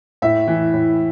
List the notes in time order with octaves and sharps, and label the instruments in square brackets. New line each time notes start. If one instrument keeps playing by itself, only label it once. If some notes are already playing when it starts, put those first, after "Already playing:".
[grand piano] A2 E5
E3
A2